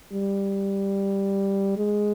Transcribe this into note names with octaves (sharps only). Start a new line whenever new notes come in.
G3
G#3